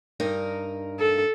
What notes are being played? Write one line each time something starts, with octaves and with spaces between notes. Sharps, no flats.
G2 D#4 A#4
A4